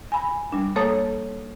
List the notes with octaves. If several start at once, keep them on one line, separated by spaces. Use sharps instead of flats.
G#5 B5
G3 D4
A#3 A4 C#5 A5 D#6